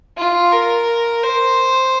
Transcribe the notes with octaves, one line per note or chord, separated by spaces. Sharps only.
F4
A#4
C5